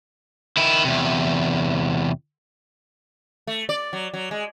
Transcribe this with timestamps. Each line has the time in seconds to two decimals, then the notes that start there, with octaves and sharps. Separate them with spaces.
0.57 D#3 E4
0.84 E2 C3
3.47 A3
3.69 D5
3.93 F#3
4.14 F#3
4.31 G#3